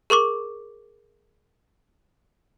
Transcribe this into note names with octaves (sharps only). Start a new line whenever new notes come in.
G#4 A#4 C#6 D6